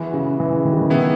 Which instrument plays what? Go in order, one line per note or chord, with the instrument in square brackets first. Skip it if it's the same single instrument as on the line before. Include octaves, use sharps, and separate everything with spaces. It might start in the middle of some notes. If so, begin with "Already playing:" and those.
Already playing: [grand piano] E3 [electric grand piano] G#3 B3 F#4
[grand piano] C#3
E3
D#3
C#3
D#3
[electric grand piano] E3 B3 E4 G#4